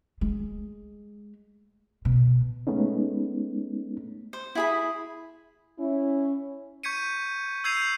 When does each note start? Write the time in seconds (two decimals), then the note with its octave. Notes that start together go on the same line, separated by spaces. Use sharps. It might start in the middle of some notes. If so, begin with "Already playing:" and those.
0.21 G#3
2.05 B2
2.67 G#3 A3 B3 C#4 D#4
4.33 C5
4.55 E4 G#4 B5
5.79 C#4 E4
6.83 C#6 G6 G#6 B6 C#7 D#7
7.64 E6 G6 G#6 C7 D#7 F7